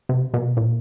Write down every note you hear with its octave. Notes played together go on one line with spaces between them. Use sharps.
C3
B2
A#2